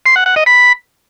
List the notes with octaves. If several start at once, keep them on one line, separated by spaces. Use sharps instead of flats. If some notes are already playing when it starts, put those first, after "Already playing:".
C6
F#5
F#5
D#5
B5